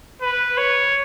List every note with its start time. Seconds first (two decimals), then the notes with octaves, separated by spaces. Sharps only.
0.21 B4
0.58 C#5